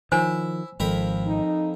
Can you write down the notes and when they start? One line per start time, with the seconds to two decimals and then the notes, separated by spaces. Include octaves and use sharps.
0.12 D#3 F3 E4 C5 C#5 G#5
0.80 G#1 F2 A#4 B5
1.27 D#4